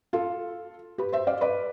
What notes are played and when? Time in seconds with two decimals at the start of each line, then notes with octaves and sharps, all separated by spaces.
0.13 F4 A4
0.98 G4 B4
1.12 C5 E5
1.27 D5 F5
1.41 B4 D5